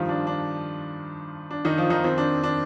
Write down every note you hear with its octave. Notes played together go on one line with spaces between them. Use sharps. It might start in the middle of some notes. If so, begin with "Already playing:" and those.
Already playing: G2 D#3 F3 F4
D4
D4
D4
D#3 D#4
F3 F4
D#3 D#4
F2 D#3 C4
D4
D4